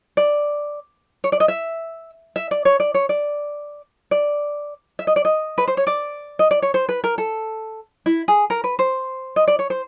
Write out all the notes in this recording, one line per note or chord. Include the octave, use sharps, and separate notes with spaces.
D5
C#5
D5
D#5
E5
E5
D5
C#5
D5
C#5
D5
D5
E5
D#5
D5
D#5
B4
C5
C#5
D5
D#5
D5
C#5
C5
B4
A#4
A4
E4
G#4
A#4
B4
C5
D#5
D5
C#5
C5